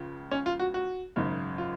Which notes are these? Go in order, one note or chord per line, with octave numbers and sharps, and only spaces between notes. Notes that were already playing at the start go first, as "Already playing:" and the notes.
Already playing: C#2 C#3 F3
C#4
F4
F#4
F#4
G#1 F#2 C#3
F4